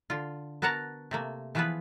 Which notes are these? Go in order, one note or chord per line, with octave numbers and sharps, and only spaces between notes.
D3 F4
B3 F#4 A#4 F#5 A5 A#5
C3 A3 A#3
E3 F3 B3 F4 G#4 B4